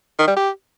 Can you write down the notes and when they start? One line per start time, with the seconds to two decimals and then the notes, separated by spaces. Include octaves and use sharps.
0.19 D#3
0.28 G3
0.36 G4